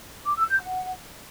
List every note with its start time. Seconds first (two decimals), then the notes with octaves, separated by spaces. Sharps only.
0.25 D6
0.37 E6
0.48 G6
0.60 F#5